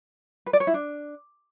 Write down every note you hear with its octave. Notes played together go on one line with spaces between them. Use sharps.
B4
D5
C#5
E4
D4